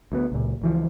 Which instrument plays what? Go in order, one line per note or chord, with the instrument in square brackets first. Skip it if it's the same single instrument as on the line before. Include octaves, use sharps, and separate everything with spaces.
[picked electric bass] D2 A#3 B3
C#2 A#2
C#2 E3 F3